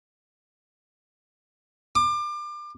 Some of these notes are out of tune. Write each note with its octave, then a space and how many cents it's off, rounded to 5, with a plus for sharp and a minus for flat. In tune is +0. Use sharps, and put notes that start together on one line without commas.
D6 +30